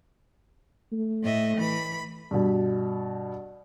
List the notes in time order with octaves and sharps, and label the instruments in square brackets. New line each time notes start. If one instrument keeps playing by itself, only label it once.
[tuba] A3
[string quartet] A2 D#5 E5
E3 B5
[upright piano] G2 B2